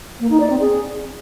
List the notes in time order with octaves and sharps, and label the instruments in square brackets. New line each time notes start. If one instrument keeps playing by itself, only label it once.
[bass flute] A#3
D#4
D5
C4
G#4